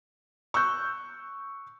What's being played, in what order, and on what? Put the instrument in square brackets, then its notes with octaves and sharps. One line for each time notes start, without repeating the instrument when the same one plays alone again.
[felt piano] C#6 E6 F#6 G6